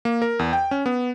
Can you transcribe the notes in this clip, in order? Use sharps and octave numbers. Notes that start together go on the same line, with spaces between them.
A#3
A#4
E2
G5
C#4
B3